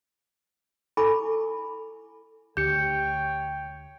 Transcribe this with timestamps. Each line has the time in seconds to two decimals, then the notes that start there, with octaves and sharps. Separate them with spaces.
0.97 E4 A4 G#5 B5 C#6 D6
2.57 D2 G4 C#5 G5 G6 C#7